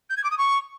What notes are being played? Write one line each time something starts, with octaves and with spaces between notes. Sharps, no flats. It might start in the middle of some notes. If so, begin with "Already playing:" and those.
G6
G#6
D6
D#6
C#6